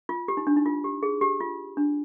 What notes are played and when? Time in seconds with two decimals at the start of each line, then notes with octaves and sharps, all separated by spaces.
0.09 F4
0.28 G4
0.37 D#4
0.47 D4
0.56 D#4
0.66 F4
0.84 G4
1.03 G#4
1.21 G4
1.40 F4
1.77 D4